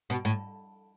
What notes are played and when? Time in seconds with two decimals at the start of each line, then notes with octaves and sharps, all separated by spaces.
0.10 B2
0.25 A2